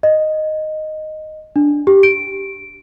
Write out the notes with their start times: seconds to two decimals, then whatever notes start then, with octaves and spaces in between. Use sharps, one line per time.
0.03 D#5
1.56 D4
1.87 G4
2.03 D7